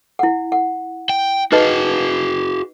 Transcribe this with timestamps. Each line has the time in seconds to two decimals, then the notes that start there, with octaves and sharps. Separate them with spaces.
0.19 E4 F#5
0.52 F#5
1.09 G5
1.52 D#4 F#4 G#4 B4 D#5